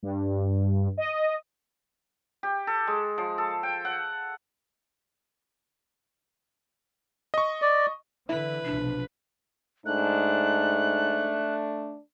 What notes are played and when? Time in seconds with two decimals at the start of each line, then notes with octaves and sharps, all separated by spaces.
0.03 G2
0.98 D#5
2.43 G4
2.67 A4
2.87 G#3
3.18 F3
3.38 A4
3.63 G5
3.85 F#5
7.34 D#5 C#6
7.62 D5
8.29 D3 E3 E4 B4
8.65 B1 C3 F3 D4
9.86 G#2 A3 D4 F#6